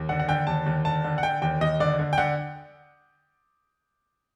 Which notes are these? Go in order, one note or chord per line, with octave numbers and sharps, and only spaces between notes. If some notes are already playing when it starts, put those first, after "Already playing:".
Already playing: D#2
D3 F#5
F#5
D3 G5
D#2 A5
D#2
D3 A5
D3
F#5
D3 G5
D#2 G5
D#2 D#5
D3 D5
D3
G5
D3 F#5